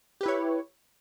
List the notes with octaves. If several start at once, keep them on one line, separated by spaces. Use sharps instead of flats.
E4 G4 B4 C#5